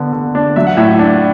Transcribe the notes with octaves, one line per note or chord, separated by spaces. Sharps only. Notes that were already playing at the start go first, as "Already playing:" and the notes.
Already playing: D3 B3
D3
D4
F#3 E5
F#5
A2 E5
D4